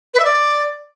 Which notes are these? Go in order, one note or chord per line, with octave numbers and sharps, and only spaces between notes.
B4
E5
D5